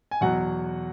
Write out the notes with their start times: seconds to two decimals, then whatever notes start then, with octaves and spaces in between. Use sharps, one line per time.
0.11 G#5
0.21 E2 B2 F#3 F#5